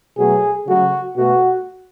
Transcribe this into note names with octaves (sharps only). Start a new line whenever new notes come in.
B2 F#3 A3 G#4
C#3 F#3 A3 F#4
B2 A3 F#4